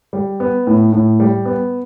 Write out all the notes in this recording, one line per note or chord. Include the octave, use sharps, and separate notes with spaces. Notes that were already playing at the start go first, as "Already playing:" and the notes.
G3
B3
A2
A2
G3
B3